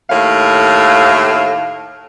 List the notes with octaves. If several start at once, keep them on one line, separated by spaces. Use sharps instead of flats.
D#2 A2 A3 F5